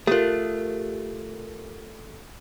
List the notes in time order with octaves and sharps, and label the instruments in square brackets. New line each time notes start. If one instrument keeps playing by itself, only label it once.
[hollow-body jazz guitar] A3 F4 [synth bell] G4 A#4